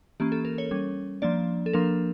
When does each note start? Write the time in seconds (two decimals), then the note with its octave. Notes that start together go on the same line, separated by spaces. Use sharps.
0.20 E3 A#3 C#4 G4
0.32 A4
0.45 A#4
0.58 C#5
0.71 G3 C#4
1.22 F3 A#3 D4 D5
1.66 A4
1.73 F3 A#3 D4 A#4